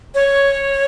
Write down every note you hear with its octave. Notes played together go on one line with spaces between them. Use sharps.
C#5